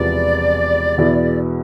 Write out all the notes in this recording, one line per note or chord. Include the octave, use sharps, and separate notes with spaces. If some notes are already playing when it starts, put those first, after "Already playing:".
Already playing: E1 E2 C3 F3 B3 D5
E2 B2 B3 E4 G#4